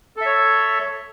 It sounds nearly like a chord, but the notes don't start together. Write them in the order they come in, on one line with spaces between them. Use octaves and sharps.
A4 E5 C#5